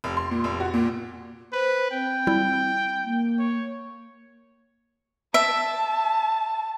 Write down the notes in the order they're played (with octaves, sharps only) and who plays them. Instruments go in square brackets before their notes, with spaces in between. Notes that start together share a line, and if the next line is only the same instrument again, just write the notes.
[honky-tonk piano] F1
C6
A#2
F1
F#4
A#2
[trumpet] B4 [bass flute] C5
[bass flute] C4 [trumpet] G5
[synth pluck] G3 E4
[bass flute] A#3
[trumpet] C#5
[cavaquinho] E5 [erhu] A5